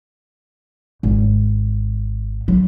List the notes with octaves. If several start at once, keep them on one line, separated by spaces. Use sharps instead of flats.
G#1
F#3